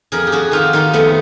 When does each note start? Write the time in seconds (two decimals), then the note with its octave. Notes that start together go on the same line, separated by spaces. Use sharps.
0.12 F2 G#4 A#4
0.27 G4
0.32 F2 F#4 G#4
0.51 D#3 F4 G4
0.73 D#3 D#4 F4
0.93 F2 A3 B3